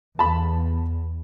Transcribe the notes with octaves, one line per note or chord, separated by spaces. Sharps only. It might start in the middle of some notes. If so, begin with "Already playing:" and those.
E2 A5 B5